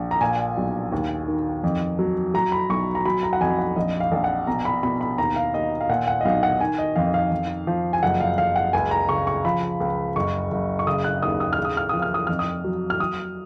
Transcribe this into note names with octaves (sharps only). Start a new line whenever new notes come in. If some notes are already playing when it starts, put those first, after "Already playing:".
Already playing: A#1
A#5
A#2 G#5
B1
D#2
D#3
F2
F#3
F#3 A#5
B5
B1 C#6
A#5
F#3 B5
A#5
F#5
F2 G#5
F#5
A#1 D#5
F5
A#1
F#5
B2 A#5
B5
B2 B5
B5
D#2 A#5
F5
D#2 D#5
F5
A#2 F#5
F#5
D#5
B1 F5
F#5
D#3 G#5
D#5
F2 F5
F5
F2
F3
G#5
F#1 F#5
F5
F#1 F5
F#5
C#2 G#5
A#5
C#3 C#6
C#6
F3 B5
C#2
F#1 C#6
F#1
C#6
C#3 D#6
F#6
D#2 D#6
D#6
F6
C#3
D#6
F6
F3 D#6
F6
D#6
F2 F6
D#6
F#3
F6
F#3 D#6